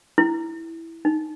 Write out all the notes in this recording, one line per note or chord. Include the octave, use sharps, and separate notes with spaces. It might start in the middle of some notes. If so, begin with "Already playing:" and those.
E4
D#4